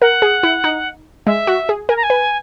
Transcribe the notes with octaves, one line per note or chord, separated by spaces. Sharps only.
A#4 F#5
G#4
E4
D#4
G#3 E5
F#4
G#4
A#4 G#5
A#5
G#5
B4